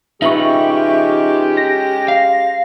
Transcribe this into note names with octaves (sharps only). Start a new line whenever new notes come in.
G#3 C#4 D#4 F4 G4 B4 E5 C#6
A#6
F5